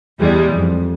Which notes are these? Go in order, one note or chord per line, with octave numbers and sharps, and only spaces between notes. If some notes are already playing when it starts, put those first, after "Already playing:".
E2 E3 G3 G#3
F2